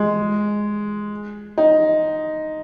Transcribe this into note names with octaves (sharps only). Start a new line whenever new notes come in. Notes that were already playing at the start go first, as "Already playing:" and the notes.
Already playing: G#3
D#4